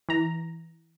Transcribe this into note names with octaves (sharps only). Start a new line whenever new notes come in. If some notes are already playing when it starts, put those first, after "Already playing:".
E3 A#5